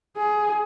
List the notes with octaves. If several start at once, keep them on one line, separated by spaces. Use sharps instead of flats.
G#4